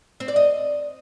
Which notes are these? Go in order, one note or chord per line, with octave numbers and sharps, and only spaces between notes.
C4
D5
D#5